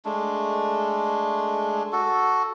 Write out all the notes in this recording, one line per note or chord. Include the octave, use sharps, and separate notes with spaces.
G#3 A3 D4
F#4 A4